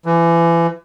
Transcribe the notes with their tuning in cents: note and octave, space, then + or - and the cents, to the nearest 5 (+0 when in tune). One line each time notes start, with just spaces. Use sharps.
E3 +30